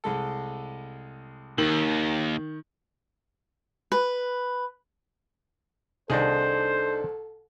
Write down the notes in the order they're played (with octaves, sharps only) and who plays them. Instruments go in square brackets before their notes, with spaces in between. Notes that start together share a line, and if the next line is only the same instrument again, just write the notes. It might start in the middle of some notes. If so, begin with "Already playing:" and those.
[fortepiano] C2 G#3 A4
[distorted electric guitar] D#2 [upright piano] D#3 F#7
[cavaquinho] B4
[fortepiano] C2 D#3 [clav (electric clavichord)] D4 D#4 G#4 [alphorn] A4 [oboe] C5